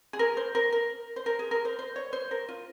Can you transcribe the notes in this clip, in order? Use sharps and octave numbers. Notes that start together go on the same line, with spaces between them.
G#4
A#4
C5
A#4
A#4
C5
A#4
G#4
A#4
C5
C5
C#5
C5
A#4
F4